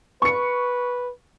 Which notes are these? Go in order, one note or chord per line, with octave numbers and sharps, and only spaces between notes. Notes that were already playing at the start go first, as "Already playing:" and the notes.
B4 C#6 C#7